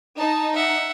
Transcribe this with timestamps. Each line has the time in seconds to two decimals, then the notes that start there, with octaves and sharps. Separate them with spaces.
0.18 D#4 A5
0.55 E5 F#5